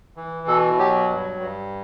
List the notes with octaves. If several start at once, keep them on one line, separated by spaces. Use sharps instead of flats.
E3
B2 A4
F#3 G4
G2
G2